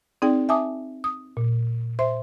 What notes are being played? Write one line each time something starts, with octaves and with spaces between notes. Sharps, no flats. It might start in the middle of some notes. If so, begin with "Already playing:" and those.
C4 D#4 G#4 D5 G5
E5 G#5 A5 D6 D#6
D#6
A#2
C5 E5 C6